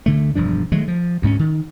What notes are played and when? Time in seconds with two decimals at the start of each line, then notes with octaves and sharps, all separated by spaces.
0.06 D2 D3 A3
0.35 E1 G2 F3 D4
0.72 D#3 F#3 G#3 A3
0.88 F3
1.22 D2 G#2 A#3 C#4
1.39 D#3